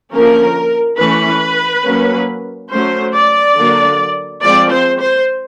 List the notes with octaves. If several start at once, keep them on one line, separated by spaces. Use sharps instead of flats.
D3 F3 A#3 C#4 A#4
E3 A3 C#4 B4
F#3 A#3 C#4
F#3 A3 C#4 C5
D5
D3 F#3 A#3
F3 G#3 C4 D5
C5
C5